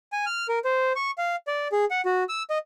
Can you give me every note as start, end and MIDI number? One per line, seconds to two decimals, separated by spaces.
0.12 0.25 80
0.26 0.47 89
0.49 0.59 70
0.65 0.92 72
0.96 1.11 85
1.18 1.36 77
1.47 1.68 74
1.72 1.85 68
1.91 2.01 78
2.05 2.24 66
2.29 2.43 88
2.50 2.58 75